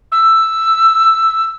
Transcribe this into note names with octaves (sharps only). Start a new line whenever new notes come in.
E6